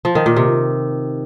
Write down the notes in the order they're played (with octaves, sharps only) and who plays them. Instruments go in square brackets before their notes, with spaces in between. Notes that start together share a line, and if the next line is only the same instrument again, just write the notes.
[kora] F3
D#3
A#2
C3